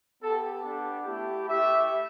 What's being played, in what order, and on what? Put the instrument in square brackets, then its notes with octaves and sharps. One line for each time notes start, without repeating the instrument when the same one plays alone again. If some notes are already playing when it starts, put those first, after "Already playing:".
[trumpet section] B3 G4 A4
B3 D4 G4 A4
A3 E4 G4
A3 E4 G4 E5